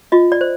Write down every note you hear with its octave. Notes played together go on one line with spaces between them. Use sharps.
F4 D#5
D5
C5